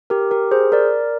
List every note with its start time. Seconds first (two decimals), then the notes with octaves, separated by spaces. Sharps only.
0.10 G4 A#4
0.31 G4 A#4
0.51 G#4 C5
0.72 A#4 D5